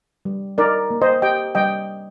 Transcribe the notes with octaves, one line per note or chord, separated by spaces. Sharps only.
G3
D#4 A#4 D5
A#3
C5 D#5
G4 D#5 G5
G3 D#5 G5